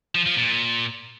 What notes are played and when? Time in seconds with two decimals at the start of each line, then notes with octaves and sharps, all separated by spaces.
0.15 F3
0.26 F3
0.37 A#2